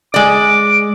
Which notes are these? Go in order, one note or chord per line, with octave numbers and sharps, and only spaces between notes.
G#3 D5 D6